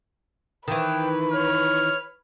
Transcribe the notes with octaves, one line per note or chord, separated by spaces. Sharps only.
D#3 E3 B4 G5
C#5 F6